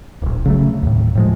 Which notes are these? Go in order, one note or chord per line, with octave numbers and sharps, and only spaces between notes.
D1 A#1
C#3 F#3 A3
D#2 A2
A2 F3 G#3